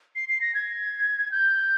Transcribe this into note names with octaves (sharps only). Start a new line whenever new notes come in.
C7
C7
A#6
G#6
G6